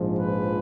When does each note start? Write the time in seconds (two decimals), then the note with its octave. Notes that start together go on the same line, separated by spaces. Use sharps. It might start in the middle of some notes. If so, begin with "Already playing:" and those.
Already playing: A#1 G#2 F3
0.17 B4